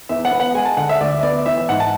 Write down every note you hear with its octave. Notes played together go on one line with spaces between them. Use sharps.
E2 E5
F#5
B3
F#5
G#3 G#5
A5
D3 F#5
E5
D2 D5
E5
B3 D5
E3 E5
E5
G#2 F#5
A5